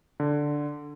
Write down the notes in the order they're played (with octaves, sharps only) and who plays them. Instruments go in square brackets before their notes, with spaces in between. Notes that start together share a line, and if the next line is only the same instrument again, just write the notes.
[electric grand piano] D3